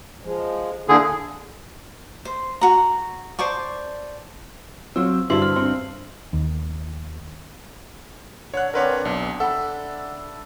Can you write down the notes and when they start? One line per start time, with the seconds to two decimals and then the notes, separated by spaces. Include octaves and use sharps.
0.24 F3 G#3
0.89 D3 A#3 D4 E4 G#4
2.25 C5
2.61 F#4 A#5
3.39 C5 D5 A5 C#6
4.96 F#3 C4 F4 E6
5.30 G2 D3 E4 F#4 C5 C6 C7 F#7
5.42 C5 F6
5.56 C4 D4
6.33 D#2
8.54 D3 C#5 F#6
8.74 D3 C4 D4 A#4 B4 C#5
9.05 B1
9.40 A4 E5 F#5 B5